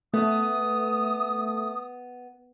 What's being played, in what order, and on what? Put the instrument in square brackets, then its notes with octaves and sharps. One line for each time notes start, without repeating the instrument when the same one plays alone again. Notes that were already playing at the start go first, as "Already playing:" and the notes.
[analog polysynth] A3 [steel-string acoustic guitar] B3 [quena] D#6